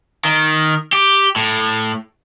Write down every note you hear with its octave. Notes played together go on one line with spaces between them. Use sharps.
D#3
G4
A2